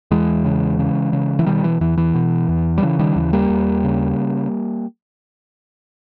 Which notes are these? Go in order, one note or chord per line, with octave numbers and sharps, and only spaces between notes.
E2 E3 G#3
C#3
C#3
C#3
E3
B2 D#3 G3
E3
E2 E3
E3
B2
E2
G3
C#3 E3
D#3 G3
D#2 E3
G3 A#3
D#2
C#3